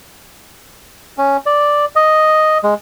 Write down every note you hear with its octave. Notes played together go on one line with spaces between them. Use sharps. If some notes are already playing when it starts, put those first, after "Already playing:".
C#4
D5
D#5
G#3